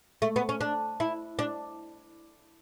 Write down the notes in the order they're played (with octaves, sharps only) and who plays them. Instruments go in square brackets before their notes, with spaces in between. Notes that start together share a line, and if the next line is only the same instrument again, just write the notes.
[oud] A3
B3
C#4
D4
E4
D4